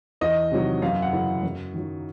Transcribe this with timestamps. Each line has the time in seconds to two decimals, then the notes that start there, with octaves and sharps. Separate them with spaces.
0.21 E2 D#5
0.52 C3 D#3 F#3
0.82 F#2 F5
1.02 F#5
1.13 C#3 E3
1.43 F#2
1.74 D#3 F#3